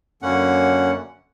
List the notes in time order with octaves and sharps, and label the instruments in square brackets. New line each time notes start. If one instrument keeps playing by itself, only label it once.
[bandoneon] F#2 D3 A#3 C#4 F#5